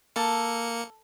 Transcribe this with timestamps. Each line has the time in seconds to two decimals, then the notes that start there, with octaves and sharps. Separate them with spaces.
0.16 A#3 A4 C#7